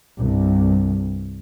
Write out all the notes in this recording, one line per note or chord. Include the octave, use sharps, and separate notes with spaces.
C2 G2